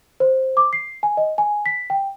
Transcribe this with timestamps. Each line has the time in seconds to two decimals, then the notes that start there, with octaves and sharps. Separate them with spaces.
0.20 C5
0.57 D6
0.73 C7
1.03 G#5
1.17 D#5
1.38 G#5
1.66 B6
1.90 G5